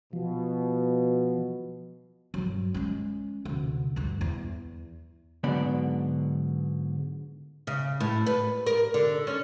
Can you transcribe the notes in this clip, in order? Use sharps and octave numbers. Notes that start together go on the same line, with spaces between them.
B2 F3
G2 F#3
G#3 C#4
D2 C3
D2 G2
E2
G#2 D3 F#3 B3 D5 B5
C#3
A2
B4
A#4
D3
C#4